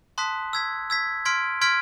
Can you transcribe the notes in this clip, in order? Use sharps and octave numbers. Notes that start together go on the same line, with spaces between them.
A5 C6 D#6 F#6 B6
E6 G#6 B6
E6 G#6 B6
C6 F6 G#6 B6 D7
C6 F6 G#6 B6 D7